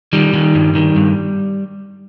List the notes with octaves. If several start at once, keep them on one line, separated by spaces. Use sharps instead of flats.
D#3 G3
D#3
G2
D#3
G2